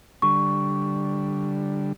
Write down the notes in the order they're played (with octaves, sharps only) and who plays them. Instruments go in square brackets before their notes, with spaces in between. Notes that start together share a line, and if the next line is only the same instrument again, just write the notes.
[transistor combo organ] D3 G3 [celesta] C#6